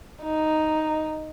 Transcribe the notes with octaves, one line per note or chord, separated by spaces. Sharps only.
D#4